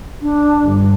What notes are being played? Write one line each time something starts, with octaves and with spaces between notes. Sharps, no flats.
D4
G1 G2